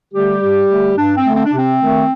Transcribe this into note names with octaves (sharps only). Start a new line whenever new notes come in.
D3 G3 A3 G4
G2
D3 A3
G2 D4
C4
D3 A3
C4
D4
C3 C4
D#3 A3